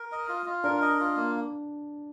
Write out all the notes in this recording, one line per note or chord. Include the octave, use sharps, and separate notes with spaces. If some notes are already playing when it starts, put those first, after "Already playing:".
Already playing: A#4
D#5
F4
F4
D4 A#4
D#5
F4
A#3